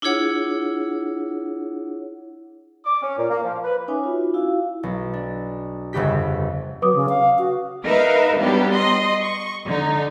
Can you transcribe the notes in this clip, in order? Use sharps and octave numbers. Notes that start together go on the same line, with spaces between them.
D4 E4 F4 G#4 C#5 F#5
D6
C#4
A#2
A#3
F3
B4
C#4 D#4 C#5 E5 G#5 D6
F4 F#4
E4 F#4 F5
B1
D4
G1 F2 C#3 B3 G4 B6
F#3 B4 D6 D#6
C#3
F5
F#4
D#4 A#4 B4 E5 F5
F#3 G3 B3 D4 G4
D#5 C6
C#6
D3 D#4